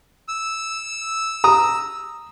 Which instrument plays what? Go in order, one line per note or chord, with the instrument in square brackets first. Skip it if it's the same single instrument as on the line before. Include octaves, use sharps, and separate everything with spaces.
[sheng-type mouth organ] E6
[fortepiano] A#5 D#6